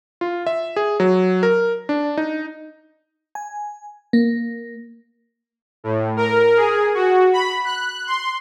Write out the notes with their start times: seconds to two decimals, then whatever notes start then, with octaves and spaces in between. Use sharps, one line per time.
0.21 F4
0.47 E5
0.76 G#4
1.00 F#3
1.43 A#4
1.89 D4
2.17 D#4
3.35 G#5
4.13 A#3
5.84 A2
6.17 A#4
6.57 G#4
6.95 F#4
7.33 B5
7.65 F#6
8.07 C6